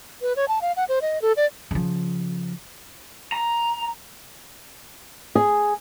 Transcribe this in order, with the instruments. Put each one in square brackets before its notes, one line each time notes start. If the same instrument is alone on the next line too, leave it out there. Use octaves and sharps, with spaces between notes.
[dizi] B4
C#5
A5
F5
F#5
C5
D#5
A4
D5
[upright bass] C#3 F3
[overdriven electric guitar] A#5
[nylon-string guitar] G#4